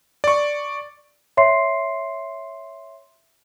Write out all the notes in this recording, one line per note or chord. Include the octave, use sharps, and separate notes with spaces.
D5 C#6
C#5 E5 C6 C7